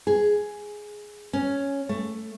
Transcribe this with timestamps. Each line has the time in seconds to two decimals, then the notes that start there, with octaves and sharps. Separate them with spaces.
0.07 G#4
1.33 C#4
1.89 A3